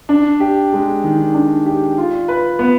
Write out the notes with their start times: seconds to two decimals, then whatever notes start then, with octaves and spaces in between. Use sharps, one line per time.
0.09 D4
0.40 G4
0.73 G#3
1.04 D#3
1.34 D4
1.66 G4
1.98 F4
2.28 B4
2.59 B3